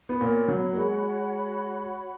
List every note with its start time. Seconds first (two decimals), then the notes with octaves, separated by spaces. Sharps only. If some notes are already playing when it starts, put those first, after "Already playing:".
0.09 B3
0.20 A#2 A#3 F#4 C#5 F#5 B5
0.48 F#3
0.73 A#3
0.77 G#3